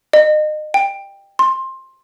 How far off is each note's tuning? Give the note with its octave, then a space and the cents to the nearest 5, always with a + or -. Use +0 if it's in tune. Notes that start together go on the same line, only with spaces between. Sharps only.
D#5 -30
G5 +15
C6 +15